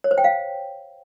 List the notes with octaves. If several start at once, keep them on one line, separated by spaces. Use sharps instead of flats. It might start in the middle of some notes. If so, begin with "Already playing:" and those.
C#5
C5
G5
F5